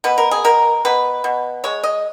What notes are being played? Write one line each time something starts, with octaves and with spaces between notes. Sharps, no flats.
B2 B4
A#4
G#4
B2 A#4
B2 B4
B2
G#3 C#5
D#5